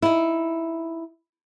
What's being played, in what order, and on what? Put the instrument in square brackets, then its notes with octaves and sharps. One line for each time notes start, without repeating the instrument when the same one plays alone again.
[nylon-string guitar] D#4 E4